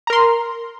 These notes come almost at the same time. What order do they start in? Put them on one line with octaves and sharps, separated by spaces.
A#5 A#4 C6